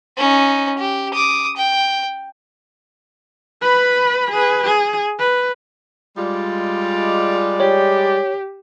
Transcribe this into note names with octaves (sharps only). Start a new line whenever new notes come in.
C#4 D#4
G4
D6 D#6
G5
B4 B5
G#4 B4
G#4
B4
G3 G#3 F4 D5
G4 C#5